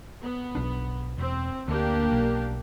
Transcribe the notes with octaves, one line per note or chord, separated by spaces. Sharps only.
B3
B1 D4
E1 C4
D2 A#3 D4 G4
B1